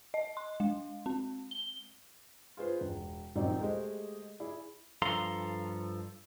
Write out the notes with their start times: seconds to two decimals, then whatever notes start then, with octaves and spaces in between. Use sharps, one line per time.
0.14 D#5
0.37 C6
0.60 G#3
1.06 C4
1.51 G7
2.57 F4 G#4 B4 C5
2.81 E1
3.36 D#1 F#3 C4 D#4 D5
3.61 G#3 A3 G4 C5 D#5
4.40 E4 G#4 D5
5.02 G2 F3 A4 F5 A#5 C6